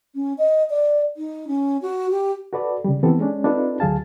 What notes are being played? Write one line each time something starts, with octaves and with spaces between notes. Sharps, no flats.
C#4
D#5
D5
D#4
C#4
F#4
G4
F#4 A4 B4 D5
C#3 G3
E3 B3 C4 G4 A4
G#3 C#4 D4
C4 D4 D#4 F4 A4 B4
D2 F#3 G#4 F5 A5